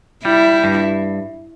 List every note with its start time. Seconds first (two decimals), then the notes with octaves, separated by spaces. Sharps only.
0.25 G3 E4
0.64 G2